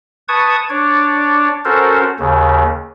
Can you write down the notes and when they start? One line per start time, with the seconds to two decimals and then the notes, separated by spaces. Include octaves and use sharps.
0.28 B4 A5 C#6 D#6 G#6
0.69 D4 C#5 D5
1.65 C#4 F#4 A4 A#4 C5
2.19 D#2 C#3